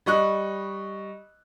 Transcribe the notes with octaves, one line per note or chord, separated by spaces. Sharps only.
G3 D#5 C#6 F#6